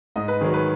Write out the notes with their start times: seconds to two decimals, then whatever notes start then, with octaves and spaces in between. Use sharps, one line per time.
0.16 G#2 D#5
0.28 B4
0.41 D#3 F#3 G#4
0.54 B4